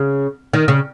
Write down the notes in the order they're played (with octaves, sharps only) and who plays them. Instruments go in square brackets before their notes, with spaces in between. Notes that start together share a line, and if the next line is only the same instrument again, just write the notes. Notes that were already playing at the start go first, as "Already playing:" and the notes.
Already playing: [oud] C#3
D#3
C#3